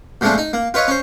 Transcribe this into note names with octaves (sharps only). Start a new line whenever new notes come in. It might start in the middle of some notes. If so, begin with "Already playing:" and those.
A#2 F3 G#3 A3 D4
D#4
A#3
F4 B4 C#5 D#5
C#4 C5